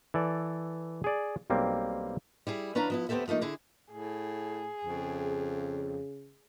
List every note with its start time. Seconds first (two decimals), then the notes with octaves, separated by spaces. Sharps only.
0.14 E3 A4 D5
1.04 G#4 D5
1.50 B1 G3 A#3 C4
2.47 G3 E4 G#4
2.75 E3 C#4 D4 B4 F5 A#5
2.90 F3 B3 E4
3.09 D2 B3 C4 G4 A4 E5
3.28 F3 A3 A#3 D#4
3.41 D3 E4 G#4
3.91 A2 G#4
4.84 F2 C#3